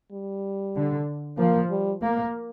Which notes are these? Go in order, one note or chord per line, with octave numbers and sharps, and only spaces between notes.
G3
D3
F3 A#3
G3
A#3